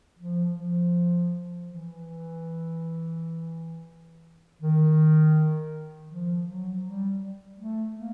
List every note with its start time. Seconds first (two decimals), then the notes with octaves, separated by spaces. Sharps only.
0.18 F3
0.55 F3
1.66 E3
4.62 D#3
6.11 F3
6.47 F#3
6.85 G3
7.58 A3
7.96 A#3